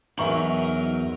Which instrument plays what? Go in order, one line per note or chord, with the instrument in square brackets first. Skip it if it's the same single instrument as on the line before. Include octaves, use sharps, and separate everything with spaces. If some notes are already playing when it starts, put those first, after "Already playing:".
[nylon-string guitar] E2 [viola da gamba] F#3 D#4 A#4 [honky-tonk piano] E5 C#6 F#7